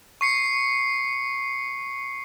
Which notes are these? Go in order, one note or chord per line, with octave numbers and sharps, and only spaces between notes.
C#6 C7 C#7